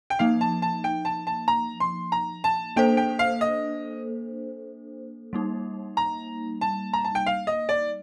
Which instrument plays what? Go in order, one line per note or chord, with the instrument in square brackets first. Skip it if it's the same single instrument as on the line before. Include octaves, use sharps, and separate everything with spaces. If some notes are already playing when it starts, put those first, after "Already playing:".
[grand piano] G5
[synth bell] F3 A#3 D#4 [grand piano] F5
[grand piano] A5
A5
G5
A5
A5
A#5
C6
A#5
A5
[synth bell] A#3 D4 A4 C5 [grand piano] G5
[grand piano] G5
F5
D#5
[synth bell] G3 A#3 D#4
[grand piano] A#5
A5
A#5
A5
G5
F5
D#5
D5